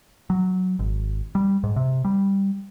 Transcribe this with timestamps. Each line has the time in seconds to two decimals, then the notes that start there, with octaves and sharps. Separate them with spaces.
0.30 F#3
0.79 G#1
1.35 G3
1.63 G#2
1.76 C3
2.05 G3